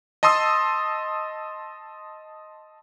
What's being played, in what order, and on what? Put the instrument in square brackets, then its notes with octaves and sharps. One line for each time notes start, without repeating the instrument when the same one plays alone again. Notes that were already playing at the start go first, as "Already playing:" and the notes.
[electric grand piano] D#5 A5 C6 D#6 E6